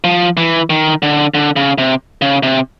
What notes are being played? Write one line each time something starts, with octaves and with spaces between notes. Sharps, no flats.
F3
E3
D#3
D3
D3
C#3
C3
C#3
C3